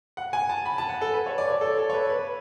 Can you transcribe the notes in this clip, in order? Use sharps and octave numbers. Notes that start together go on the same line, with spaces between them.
F#5
G#5
A5
B5
A5
F#5
A4
B4
C#5
D5
C#5
A4
A4
C#5
B4
B4